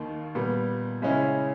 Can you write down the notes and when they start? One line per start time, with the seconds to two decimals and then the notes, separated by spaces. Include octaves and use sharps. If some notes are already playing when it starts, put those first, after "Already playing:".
Already playing: D#2 D#3 A#3
0.35 A#2 G3 B3
1.02 C#3 G#3 C#4 E4